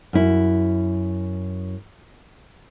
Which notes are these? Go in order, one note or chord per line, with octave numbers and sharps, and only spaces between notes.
F#2 E4